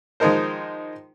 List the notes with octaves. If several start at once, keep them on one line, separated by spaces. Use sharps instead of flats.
D#3 F3 G#3 D#4 A#4 C5